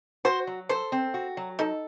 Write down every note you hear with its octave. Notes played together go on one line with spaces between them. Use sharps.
F#4 C5
F#3
A4 C5
C4
F#4
F#3
D#4 A4